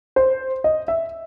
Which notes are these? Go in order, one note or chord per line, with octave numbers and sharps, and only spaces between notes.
C5
D#5
E5